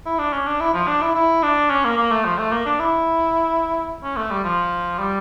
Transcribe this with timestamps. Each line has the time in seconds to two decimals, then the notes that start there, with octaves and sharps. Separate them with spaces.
0.06 E4
0.19 D4
0.33 C#4
0.47 D4
0.61 E4
0.74 F3
0.88 D4
1.02 E4
1.15 E4
1.43 D4
1.70 C#4
1.84 A#3
1.97 A#3
2.11 A3
2.25 F3
2.39 A3
2.52 A#3
2.66 D4
2.80 E4
4.03 C#4
4.17 A3
4.30 G3
4.44 F3
4.99 G3